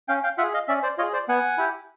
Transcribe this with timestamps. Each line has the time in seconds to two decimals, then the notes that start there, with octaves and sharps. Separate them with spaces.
0.08 C#4 F5 G5
0.23 F5 G5
0.38 F4 E5 F#5
0.43 G#4
0.54 D#5 F5
0.68 C#4 D5 E5
0.83 C5 D5
0.98 F4 C#5 D#5
1.03 G#4
1.13 C5 D5
1.29 B3 F#5 G#5
1.58 E4 G4